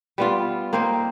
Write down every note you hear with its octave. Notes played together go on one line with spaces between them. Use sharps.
G3 B3 F4
A#3 C4 D#4 C5